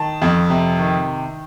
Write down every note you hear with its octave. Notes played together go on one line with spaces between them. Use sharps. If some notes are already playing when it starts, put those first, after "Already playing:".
Already playing: D#3 A5
F2
C3
D#3